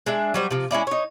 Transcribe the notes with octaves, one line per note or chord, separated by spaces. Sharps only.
G#3 D4 E5
F#3 G3 C5
C3 F3
G#3 C#4 E4 D5
D#4 C#5